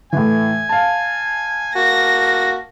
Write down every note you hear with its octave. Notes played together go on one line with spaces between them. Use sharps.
A2 E3 G#5
F5 A5
A#3 F#4 A#6